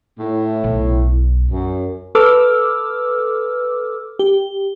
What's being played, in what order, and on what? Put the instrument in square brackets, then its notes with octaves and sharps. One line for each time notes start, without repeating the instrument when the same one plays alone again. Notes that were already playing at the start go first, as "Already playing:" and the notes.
[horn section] A2
[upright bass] B1
[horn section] F#2
[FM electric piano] A4 B4 D6 E6 F6
G4